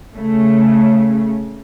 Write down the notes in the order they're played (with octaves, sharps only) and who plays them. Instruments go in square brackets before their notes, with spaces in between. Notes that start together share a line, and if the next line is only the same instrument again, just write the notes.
[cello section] C#3 A3